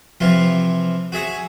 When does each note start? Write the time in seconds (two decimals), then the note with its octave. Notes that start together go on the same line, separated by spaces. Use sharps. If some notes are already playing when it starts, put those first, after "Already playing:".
0.20 C3 E3 F3 F4
1.12 F#4 G#4 E5 F#5